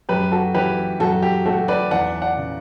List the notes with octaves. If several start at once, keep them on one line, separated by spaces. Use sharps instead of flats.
F#2 G4 B4
F#4 A4
E3 G4 B4
F#2 F#4 A4
G4
A3 F#4 A4
B4 D5
E2 D5 F#5
D5 F#5
C#3